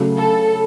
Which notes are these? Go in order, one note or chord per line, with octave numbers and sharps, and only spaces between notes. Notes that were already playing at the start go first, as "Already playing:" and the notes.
Already playing: C#3 F#3 A3
A4